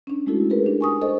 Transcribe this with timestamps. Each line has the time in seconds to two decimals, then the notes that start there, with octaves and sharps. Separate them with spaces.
0.07 C#4 D4
0.26 G#3 A3 D#4 E4 F#4 A4
0.50 G#4 A#4 B4
0.64 D4 G4
0.81 G#5 C#6 D#6
1.02 A4 C5 D#5